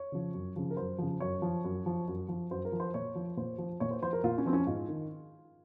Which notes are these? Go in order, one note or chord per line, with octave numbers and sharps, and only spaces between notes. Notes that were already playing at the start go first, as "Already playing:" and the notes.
Already playing: C#5
C#3 F3
F#2
C#3 F3
A#4
F#2 C5
C#3 F3
F#2 C#5
F3
F#2
F3
F#2
F3
F#2 C5
A#4
F3
C5
A#2 C#5
F3
A#2 C5
F3
A#2 C#5
C5
F3 C5
A#4
A#2 F4
C#4
F3 C4
C#4
G#2 F4
D#3